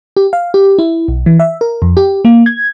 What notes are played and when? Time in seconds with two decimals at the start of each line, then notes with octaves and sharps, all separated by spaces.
0.17 G4
0.33 F5
0.54 G4
0.79 E4
1.08 B1
1.26 E3
1.40 E5
1.61 A#4
1.82 F2
1.97 G4
2.25 A#3
2.46 G#6